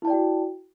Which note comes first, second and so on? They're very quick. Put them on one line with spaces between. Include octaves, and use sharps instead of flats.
E4 A5 D5 G5 F#4